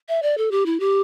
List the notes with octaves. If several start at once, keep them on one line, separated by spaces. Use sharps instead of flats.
E5
D5
A4
G4
E4
G4